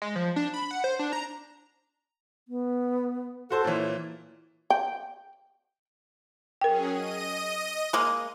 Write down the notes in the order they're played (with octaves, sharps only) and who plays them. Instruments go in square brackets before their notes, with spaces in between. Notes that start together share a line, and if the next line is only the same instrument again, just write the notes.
[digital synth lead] G#3
F3
D4
B5
F#5
C5
D4
A#5
[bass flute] B3
[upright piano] F#4 C5 A5 [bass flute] A4
[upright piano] A#2 E3 [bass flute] C#5
[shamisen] G5
[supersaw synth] F#3 C#4 G#4 [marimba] A#4 G5
[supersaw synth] D#5 D#7
[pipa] G#3 A#3